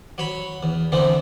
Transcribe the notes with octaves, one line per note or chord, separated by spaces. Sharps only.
F#3 C#5 B5
E2
D3 E3 B3 C4